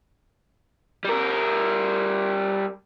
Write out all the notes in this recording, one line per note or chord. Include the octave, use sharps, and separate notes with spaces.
G3 A#4